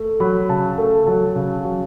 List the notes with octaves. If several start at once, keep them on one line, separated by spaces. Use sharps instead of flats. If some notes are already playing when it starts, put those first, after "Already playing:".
Already playing: A3
F#3 B5
C#3 A5
A3
F#3 A5
C#3
F#3